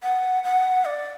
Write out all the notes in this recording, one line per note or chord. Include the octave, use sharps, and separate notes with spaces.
F#5
F#5
D5